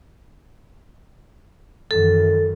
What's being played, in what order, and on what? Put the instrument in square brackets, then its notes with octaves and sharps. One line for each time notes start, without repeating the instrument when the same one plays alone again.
[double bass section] F#2 D#3 E3 [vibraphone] A4